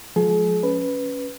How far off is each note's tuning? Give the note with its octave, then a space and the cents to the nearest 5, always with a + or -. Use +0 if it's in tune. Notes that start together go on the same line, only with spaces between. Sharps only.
F3 +30 G#3 +30 G#4 +40
C#4 +0 B4 +0